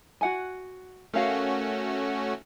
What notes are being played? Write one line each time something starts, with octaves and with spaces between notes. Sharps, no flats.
F#4 F#5 G#5
A3 C#4 F#4 A#4 F5